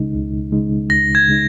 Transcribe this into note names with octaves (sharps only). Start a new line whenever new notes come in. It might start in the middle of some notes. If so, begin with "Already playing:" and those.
Already playing: C#2 C#3 G#3 D#4
C#2
C#3 G#3 D#4
C#2 A#6
G#6
C#3 G#3 D#4